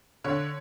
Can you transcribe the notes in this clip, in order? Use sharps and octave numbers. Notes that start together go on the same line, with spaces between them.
D3 C#5